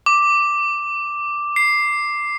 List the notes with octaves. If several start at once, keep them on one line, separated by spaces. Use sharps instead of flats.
D6
C7